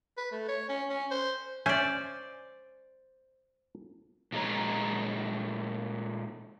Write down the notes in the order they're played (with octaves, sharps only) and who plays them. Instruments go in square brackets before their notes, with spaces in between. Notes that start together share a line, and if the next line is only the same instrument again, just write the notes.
[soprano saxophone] B4
A3
C#5
C#4
C#4
C5
[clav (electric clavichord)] C#4 E5 G#5 [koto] C5 D5
[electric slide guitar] A#2 G#3 D#4 A4 C#5 A#5